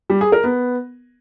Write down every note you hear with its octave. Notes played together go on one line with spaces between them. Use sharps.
G3
G#4
A#4
B3